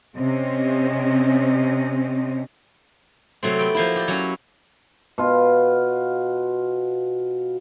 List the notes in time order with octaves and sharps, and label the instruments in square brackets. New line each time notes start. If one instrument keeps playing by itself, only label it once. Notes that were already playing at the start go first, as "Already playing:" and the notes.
[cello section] C3 C4 C#4 D#5
[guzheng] C3 F#3 A3 C4
B3 G5
F3 A#3 E4
G4 D5
F#3 C#4
[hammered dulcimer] B2 F4